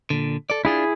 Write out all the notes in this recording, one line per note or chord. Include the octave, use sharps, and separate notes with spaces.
A#2 D3
A4 D5
D4 E4 F4 G#4